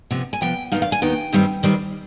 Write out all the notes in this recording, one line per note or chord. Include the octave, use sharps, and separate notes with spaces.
C3 F3 B3
G#5
C3 F3 B3 G5
D#2 D#3 B3 D#4 F5
F5
G#5
D#2 D#3 B3 D#4 G5
G2 D#3 G3 C4
G2 D#3 G3 C4